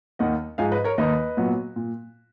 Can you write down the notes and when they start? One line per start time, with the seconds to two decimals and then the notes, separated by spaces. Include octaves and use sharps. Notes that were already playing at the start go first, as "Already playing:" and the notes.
0.19 D#2 D#3 A#3 D#5 F#5
0.58 G#2 F3 G#3 F5 G#5
0.72 B4 D#5
0.84 A#4 C#5
0.98 D#2 D#3 A#3 D#4 B4 D#5
1.37 A#2 F#3 B3
1.76 A#2